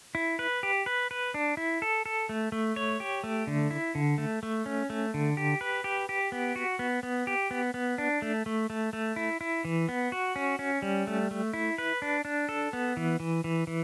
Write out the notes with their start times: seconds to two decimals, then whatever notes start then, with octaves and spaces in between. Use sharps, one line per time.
0.15 E4
0.39 B4
0.63 G4
0.86 B4
1.11 B4
1.34 D4
1.57 E4
1.82 A4
2.06 A4
2.29 A3
2.52 A3
2.76 C#5
3.00 G4
3.24 A3
3.47 D3
3.71 E4
3.95 D3
4.18 A3
4.43 A3
4.66 C#4
4.90 A3
5.14 D3
5.37 G4
5.61 B4
5.84 G4
6.09 G4
6.32 B3
6.56 F#4
6.79 B3
7.03 B3
7.27 G4
7.51 B3
7.74 B3
7.98 D4
8.22 A3
8.46 A3
8.70 A3
8.93 A3
9.16 E4
9.41 E4
9.65 E3
9.89 B3
10.12 F#4
10.36 C#4
10.59 C#4
10.82 G3
11.07 A3
11.31 A3
11.53 E4
11.78 B4
12.02 D4
12.25 D4
12.49 A4
12.73 B3
12.97 E3
13.20 E3
13.44 E3
13.67 E3